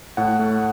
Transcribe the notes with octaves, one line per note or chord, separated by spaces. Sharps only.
A2 F#5
A3